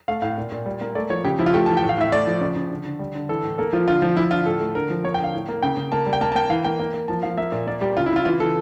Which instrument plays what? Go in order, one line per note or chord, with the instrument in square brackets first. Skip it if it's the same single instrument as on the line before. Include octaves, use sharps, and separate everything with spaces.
[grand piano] A3 F5
A2 F5
A#2
A#2
G3
A#3
A3 D5
F3 C#5
C#3 G4
F3 E4
F4
A3 G4
E3 A5
G5
A2
F5
A2 E5
A3 D5
F3
C#3 D5
C#3
D3
D3
G3
D3
E3 A4
A2
A#3 A4
F3 F4
D3 F4
F3
F3 E4
D3 F4
A2 A4
A3
D3 A#4
F3
A#3 C#5
G5
D3
F5
A2
A#3
C#3 G5
C#3
A#3 A5
G3
G5
A#3 A5
A5
A#3 G5
E3 F5
A#3 G5
A#3
A#3
F3 A5
F3 F5
A#3 E5
A#2
A#3 D5
G3 G4
C#3 F4
E4
C#3 F4
E3 F4
E3 A4